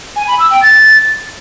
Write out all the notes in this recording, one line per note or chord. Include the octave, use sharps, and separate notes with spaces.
G#5
B5
E6
G5
A6